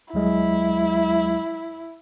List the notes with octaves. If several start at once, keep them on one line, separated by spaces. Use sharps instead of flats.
D2 F#3 G#3 E4